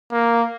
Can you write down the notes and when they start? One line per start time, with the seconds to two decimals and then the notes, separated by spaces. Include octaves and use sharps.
0.12 A#3